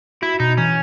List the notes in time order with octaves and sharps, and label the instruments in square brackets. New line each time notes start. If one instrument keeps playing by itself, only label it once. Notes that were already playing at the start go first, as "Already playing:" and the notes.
[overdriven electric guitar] E4 [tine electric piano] F#4
[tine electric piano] B2 [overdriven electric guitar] D#4
[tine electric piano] E3 [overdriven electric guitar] C#4